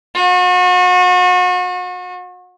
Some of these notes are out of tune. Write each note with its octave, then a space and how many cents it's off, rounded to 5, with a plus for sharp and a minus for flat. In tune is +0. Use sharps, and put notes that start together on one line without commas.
F#4 -35